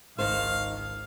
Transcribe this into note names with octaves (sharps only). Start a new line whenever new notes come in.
G#1 C#2 D#3 C5 F5